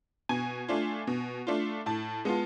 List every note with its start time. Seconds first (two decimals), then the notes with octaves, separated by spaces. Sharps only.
0.29 B2 G#5
0.68 A3 D4 F4
1.07 B2
1.47 A3 D4 F4
1.86 A2 A5
2.25 G#3 B3 F4